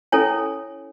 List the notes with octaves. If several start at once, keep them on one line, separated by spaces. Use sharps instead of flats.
C#4 E4 A4 C#5 G#5